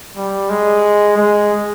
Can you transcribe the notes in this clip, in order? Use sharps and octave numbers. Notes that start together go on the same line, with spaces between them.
G3
G#3
G#3